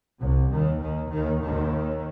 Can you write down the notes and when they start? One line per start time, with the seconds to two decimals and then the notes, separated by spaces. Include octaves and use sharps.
0.20 C2 C3
0.50 D#2 D#3
0.80 D#2 D#3
1.10 D#2 D#3
1.40 D#2 D#3